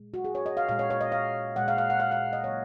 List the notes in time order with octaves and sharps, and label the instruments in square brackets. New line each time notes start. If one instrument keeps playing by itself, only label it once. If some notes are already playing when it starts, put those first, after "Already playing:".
Already playing: [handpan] A#2 G#3
F#4
G#4
C#5
D#5
F5
A#2 G#3 F5
C#5
C#5
D#5
F5
A#2 G#3 F#5
F5
F5
F#5
F5
F5
D#5
C#3 F#3 A#3 C#5